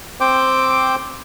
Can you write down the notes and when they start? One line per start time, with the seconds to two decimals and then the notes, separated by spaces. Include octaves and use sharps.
0.20 C4 C5 G5 D6